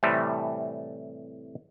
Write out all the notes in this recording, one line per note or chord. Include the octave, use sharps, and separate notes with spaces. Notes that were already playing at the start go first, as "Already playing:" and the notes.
A2 C3 E3 G3 A3 C4